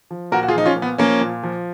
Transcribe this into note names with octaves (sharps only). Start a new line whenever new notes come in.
F3
A#2 F#4 A#4
F#4
F4 G#4
F3 D#4
C#4 F4
A#2
B3
F3 A#3 C#4
A#2
F3